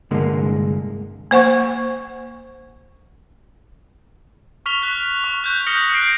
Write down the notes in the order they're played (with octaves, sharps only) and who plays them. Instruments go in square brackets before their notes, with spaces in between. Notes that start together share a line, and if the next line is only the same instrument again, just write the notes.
[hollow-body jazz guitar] C2 G2 D3 G#3 A#3
[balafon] A#3 C5 F#5 C#6
[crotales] C#6 F6 B6 F7 G7
F#6 B6
C#6
F#6 G6
D#6 F6 G6 A#6 C#7 G7
F#6 C7 D7